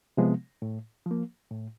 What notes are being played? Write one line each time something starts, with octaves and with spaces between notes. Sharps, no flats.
C3 F3 G#3 B3
A2
F3 A#3
A2